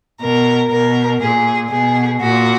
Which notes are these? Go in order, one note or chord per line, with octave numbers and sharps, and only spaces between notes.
B2 A#4
B2 A#4
A#2 G#4
B2 G#4
A#2 F#4